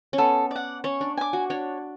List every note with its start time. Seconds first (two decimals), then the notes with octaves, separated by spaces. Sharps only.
0.13 C#4
0.18 B3 A4
0.51 D5 F#5
0.84 C#4 C#5
1.01 D4
1.17 G#5 D6
1.33 F#4
1.50 D4 C#5